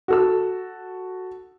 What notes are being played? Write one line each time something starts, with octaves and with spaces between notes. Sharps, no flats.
F#4 A4 E6